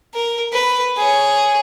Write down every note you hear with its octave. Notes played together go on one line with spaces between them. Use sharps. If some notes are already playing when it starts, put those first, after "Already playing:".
A#4
B4
G#4 C#5